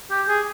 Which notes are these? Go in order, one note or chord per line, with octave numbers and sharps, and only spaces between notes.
G4
G#4